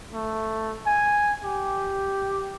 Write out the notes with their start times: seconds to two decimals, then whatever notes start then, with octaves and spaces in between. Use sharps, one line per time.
0.14 A3
0.86 G#5
1.44 G4